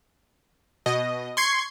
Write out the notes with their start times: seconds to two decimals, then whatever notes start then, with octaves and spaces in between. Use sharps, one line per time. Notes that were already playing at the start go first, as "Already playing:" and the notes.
0.86 B2 D#5
1.37 C6 C#6 G#6 C7